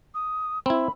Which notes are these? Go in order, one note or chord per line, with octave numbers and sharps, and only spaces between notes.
D#6
C4 E4 B5